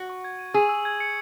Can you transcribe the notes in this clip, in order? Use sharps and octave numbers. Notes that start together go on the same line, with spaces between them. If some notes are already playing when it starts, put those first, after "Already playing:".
Already playing: F#4
C#6
G#6
D#7
G#4 E6
E6
G#6
C#7